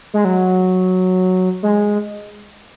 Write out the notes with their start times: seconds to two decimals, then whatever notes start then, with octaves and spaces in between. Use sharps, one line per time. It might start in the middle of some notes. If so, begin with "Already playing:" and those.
0.14 G#3
0.25 F#3
1.63 G#3